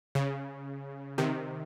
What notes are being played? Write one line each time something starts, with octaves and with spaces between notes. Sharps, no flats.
C#3
C3 D#3